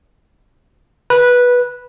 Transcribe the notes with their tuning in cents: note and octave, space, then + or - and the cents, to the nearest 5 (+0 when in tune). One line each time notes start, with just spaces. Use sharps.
B4 -10